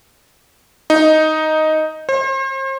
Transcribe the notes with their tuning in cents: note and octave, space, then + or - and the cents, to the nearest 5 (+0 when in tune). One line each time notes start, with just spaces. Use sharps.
D#4 +5
C5 +40